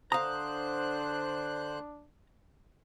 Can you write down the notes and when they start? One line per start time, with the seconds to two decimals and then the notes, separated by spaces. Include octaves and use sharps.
0.12 D3 D4 C5 F5 A#5 D#6 F#6